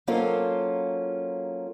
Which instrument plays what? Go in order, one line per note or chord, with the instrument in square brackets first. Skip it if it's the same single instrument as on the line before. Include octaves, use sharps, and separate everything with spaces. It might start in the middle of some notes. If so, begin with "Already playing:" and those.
[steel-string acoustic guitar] F#3 A#3 C#4 F4 A4 C5